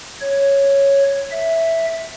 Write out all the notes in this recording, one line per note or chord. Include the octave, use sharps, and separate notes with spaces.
C#5
E5